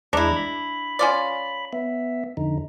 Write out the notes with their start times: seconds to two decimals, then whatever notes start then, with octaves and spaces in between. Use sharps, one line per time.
0.13 E2 G#3 D4 E4 A#5
0.36 B5
0.99 C#4 F4 D5
1.73 B3 E5
2.37 F2 D3 D#4